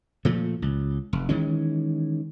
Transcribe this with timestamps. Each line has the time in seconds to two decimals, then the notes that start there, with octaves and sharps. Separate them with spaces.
0.25 A#2 F3 A3
0.62 C#2
1.13 F1
1.29 D#3 E3 G#3 C#4